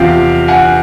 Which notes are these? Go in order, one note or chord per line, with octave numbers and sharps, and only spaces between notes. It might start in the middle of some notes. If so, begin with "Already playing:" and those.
Already playing: E2 C3 F3 F5 G5
F#5 G#5